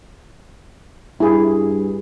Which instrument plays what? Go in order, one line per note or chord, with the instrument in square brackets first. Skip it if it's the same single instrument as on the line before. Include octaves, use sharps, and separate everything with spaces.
[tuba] G2 [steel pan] E4 G#4